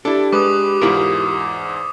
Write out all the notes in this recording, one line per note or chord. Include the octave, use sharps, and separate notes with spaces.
D4 E4 G4 A4
G#3 B4 D6 D#6
E2 G#2 E4 F4 A#4